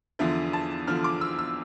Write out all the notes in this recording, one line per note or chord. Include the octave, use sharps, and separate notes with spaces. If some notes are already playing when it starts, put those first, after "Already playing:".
E2 D3 F3 E5
A5
E2 D3 F3 F6
D6
E6
E6